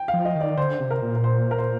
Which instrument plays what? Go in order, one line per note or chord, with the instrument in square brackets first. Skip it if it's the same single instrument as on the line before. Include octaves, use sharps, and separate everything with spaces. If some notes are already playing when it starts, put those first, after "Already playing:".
Already playing: [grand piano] G5
F5
[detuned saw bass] F3
[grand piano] D#5
[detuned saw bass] D#3
[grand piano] D5
[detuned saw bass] D3 [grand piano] C5
[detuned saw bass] C3
[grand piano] A#4
[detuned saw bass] A#2
[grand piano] A#4
C5
A#4
C5